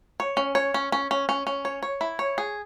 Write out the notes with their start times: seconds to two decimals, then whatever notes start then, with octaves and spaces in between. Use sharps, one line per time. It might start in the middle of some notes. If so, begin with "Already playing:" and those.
0.20 C#5
0.37 C#4
0.55 C#5
0.74 C#4
0.92 C#4
1.11 C#4
1.29 C#4
1.47 C#4
1.65 C#5
1.83 C#5
2.01 E4
2.19 C#5
2.38 G#4